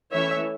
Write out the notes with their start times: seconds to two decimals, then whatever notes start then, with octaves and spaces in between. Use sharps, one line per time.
0.12 E3 A3 C#4 C#5 E5